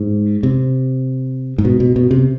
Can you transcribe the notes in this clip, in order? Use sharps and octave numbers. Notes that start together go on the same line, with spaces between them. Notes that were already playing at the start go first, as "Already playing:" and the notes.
Already playing: G#2
C3
G#2
B2
B2
B2
C3